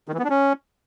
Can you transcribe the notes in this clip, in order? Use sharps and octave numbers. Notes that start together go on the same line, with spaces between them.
D#3
E3
B3
D4
C#4